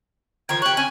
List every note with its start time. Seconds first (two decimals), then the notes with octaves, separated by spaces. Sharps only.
0.49 D#3 F3 G#6
0.62 G4 C#5 F#6
0.77 C#4 G#5